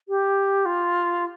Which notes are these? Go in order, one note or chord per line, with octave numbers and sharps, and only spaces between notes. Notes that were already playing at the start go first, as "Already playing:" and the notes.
G4
F4